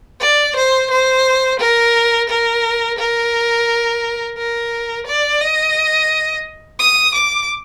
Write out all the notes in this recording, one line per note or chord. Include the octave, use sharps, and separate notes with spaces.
D5
C5
C5
A#4
A#4
A#4
A#4
D5
D#5
D#6
D6